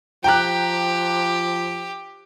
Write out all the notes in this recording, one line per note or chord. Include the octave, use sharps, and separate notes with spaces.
F3 G4 G5 A#5 F#6